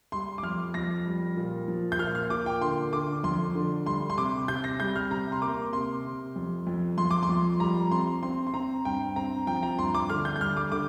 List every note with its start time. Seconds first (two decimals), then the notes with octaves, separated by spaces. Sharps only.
0.12 G3 C6
0.38 D6
0.43 F2 F6
0.74 F2 A#6
1.06 G3
1.37 A#2
1.68 F3
1.92 G6
1.99 A#2 F6
2.15 F6
2.30 A#2 D6
2.46 G5
2.61 D3 C6
2.93 D3 D6
3.24 F2 C6
3.55 D3
3.86 G3 C6
4.10 C6
4.18 C3 D6
4.48 C3 G6
4.64 A#6
4.80 G3 G6
4.96 F6
5.11 C3 A#5
5.32 C6
5.42 A#3 D6
5.73 C3 C6
6.05 C3
6.36 F2
6.67 F2
6.98 F2 C6
7.11 D6
7.23 C6
7.29 F2
7.60 G3 A#5
7.91 C4 C6
8.23 C4 C6
8.47 C6
8.54 C4 A#5
8.85 G2 G5
9.16 C4 A#5
9.47 F3 G5
9.63 A#5
9.78 G2 C6
9.94 D6
10.09 D3 F6
10.25 G6
10.36 G6
10.41 G3 F6
10.57 D6
10.72 D3 D6